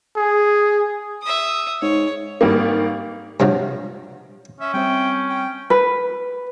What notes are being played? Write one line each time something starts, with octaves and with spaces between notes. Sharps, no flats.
G#4
E5 D#6
G#2 C#5
G#1 G3 A#3
G2 C3 F3 F#3
C#4 E5
G3 C4 E5 G5
G5
B4